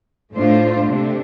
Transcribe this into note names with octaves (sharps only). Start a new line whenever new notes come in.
A2 A3 D4 F4 C5
C3 A3 D4